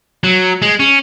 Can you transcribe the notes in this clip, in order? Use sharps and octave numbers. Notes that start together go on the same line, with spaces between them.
F#3
G#3
C#4